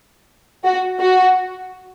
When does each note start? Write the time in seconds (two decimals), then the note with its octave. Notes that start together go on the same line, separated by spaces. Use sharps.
0.64 F#4
1.00 F#4